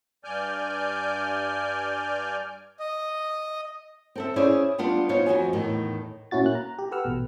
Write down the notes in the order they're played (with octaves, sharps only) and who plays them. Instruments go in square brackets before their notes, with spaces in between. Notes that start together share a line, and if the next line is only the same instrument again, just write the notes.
[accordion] G2 D5 G#5 F6 G6
[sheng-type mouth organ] D#5
[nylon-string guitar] C4 A4 E5
C#4 E4 G#4 C5 D5
G3 B3 D4 F4
B3 D#4 F4 C5 C#5
F2 F3 F#4 G#5
E2 A2 D#3
[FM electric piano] A#2 C#4 E4 F#4 A6
A#3 F#6
A#5
G4
G4 A4 B4 F#5 E6 F6
A1 B2